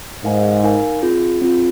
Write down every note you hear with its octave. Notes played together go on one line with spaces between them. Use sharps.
G#2 D#4 A#4 F5 G#5
D#4 A#4 F5 G#5
C4 F4 G#4
C4 F4 G#4